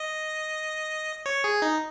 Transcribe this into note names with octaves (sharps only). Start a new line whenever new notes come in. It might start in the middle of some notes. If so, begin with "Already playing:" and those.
Already playing: D#5
C#5
G#4
D#4